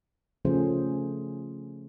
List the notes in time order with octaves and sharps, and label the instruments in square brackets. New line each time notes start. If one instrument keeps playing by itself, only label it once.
[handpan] C#3 F3 A3 C#4 G#4 C5